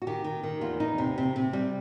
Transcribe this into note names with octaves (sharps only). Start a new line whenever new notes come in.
F#4
D#3 G4
D#3
D#3
E2 F4
E2 D#4
C3
C3
C3
G3